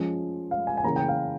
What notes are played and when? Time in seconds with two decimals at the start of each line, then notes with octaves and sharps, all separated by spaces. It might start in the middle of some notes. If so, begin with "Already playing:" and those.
Already playing: F3 G#3 C#4
0.51 F5
0.67 G#5
0.77 G#5
0.83 C#3 E3 A#3 C#4 A#5
0.96 G5
1.08 F5